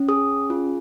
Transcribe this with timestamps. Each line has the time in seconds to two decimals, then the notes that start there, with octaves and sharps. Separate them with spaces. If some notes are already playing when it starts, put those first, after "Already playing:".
Already playing: C#4
0.08 G#4 D#6
0.50 F4